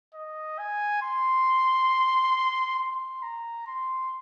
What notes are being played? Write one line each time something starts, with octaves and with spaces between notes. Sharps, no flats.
D#5
G#5
C6
C6
A#5
C6